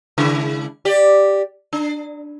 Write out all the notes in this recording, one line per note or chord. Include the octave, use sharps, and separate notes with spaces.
C#3 G#3 E4
G4 D5
D4